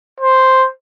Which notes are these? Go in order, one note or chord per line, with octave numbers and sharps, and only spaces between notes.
C5